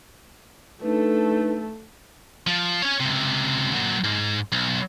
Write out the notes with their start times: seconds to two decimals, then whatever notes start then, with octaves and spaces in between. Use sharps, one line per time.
0.82 A3 D4 D#4 A4 B4
2.47 F3
2.82 C#4 C#5
3.00 C#2 C3
3.74 A#2 F#3
4.04 G#2
4.52 B1